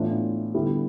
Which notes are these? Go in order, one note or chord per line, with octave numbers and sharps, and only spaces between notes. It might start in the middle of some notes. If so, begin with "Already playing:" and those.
Already playing: A2 E3 B3 D4 F4
D3 G3 B3 E4